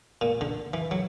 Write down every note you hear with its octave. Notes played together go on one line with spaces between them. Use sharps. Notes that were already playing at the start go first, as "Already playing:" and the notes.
A#2
D3
E3
F#3